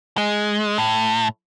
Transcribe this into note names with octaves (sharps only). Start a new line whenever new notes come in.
G#3
A2